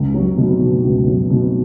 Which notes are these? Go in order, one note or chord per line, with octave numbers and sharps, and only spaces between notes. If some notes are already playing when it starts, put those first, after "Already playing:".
Already playing: C#2
F#3
B2
B2
C#2
F#3
B2